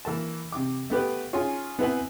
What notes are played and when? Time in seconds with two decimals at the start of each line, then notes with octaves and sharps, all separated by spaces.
0.05 E3 A#3 A5
0.52 C3 D6
0.90 A3 B3 G4 B4
1.33 C#4 F4 G#4 G#5
1.79 B3 C4 E4 B4 F#5 G#5